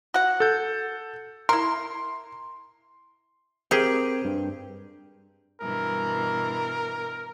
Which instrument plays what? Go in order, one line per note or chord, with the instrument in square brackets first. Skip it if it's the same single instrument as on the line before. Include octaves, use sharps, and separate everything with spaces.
[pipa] F#4 F#5
[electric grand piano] A4 G6
[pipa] E4 A#4 [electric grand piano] C6
[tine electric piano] C4 A#4 G5 [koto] G4 G#4
[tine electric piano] G2
[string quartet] G2 B2 E3 [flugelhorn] A#4